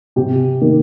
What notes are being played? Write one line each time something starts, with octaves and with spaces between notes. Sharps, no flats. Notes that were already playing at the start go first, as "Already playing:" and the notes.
C3 G4
D#3 A#3